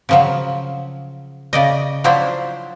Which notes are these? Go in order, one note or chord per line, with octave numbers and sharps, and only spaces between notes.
C#3 F3 F#3
C#3 D5 D#5
F3 F#3 D4 E4 C5